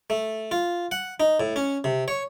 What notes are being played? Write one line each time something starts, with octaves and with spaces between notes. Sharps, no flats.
A3
F4
F#5
D#4
A2
C#4
C3
C#5